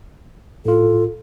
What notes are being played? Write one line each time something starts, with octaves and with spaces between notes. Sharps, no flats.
A2 F4 A4